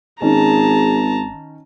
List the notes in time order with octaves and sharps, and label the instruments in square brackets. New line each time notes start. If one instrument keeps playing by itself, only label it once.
[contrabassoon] G#1 [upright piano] D#3 C#4 [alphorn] G#4 [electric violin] A5 A#5